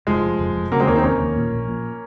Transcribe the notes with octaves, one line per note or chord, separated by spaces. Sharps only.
F1 F3 G#3
F1
F1
F1
C#3 F#3 A#3
G#3 C4
D#2 A#3 C#4
C4 D#4
F1 A#3 C#4
D#2
A#2
A#1
A#2